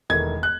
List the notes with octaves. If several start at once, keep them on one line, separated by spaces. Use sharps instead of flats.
E1 E2 D#3 A3 G#6
F#6